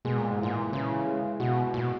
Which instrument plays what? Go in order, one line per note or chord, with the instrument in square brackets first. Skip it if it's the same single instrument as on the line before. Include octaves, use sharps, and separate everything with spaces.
[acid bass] B2 [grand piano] G#3
[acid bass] A#2
G#2
[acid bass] A#2 [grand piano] E3
[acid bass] C#3 [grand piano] E3
[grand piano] G#3
[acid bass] B2 [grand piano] F#4
[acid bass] A#2 [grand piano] F#4
[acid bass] B2